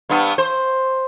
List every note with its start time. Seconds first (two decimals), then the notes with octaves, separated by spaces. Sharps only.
0.09 G2 B3
0.38 C5